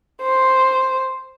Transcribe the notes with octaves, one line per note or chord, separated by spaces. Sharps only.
C5